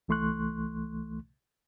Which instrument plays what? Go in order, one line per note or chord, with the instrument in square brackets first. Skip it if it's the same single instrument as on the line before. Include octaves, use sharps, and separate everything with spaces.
[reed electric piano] C2 E3 A3 C6 C#6 F#6